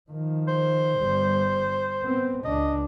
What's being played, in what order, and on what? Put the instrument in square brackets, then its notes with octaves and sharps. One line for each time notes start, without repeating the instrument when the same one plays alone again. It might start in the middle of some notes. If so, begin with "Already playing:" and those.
[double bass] D#3 F3
[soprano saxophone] C5
[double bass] G1 G3
B3 C4
[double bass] C#2 D4 [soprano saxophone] D#5